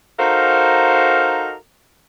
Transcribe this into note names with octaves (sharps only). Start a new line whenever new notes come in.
D#4 F#4 A4 A#4 C5 F5